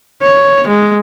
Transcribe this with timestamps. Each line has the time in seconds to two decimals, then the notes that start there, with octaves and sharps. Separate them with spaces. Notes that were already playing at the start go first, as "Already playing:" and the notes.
0.22 C#5
0.68 G#3